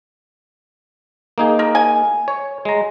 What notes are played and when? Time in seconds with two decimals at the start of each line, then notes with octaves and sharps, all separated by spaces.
1.38 A#3 D#4 G#4
1.59 A#4
1.75 G#5
2.28 C#5
2.65 G#3 A#5